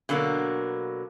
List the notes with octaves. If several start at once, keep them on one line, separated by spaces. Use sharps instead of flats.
B2 D3 F#3 A#3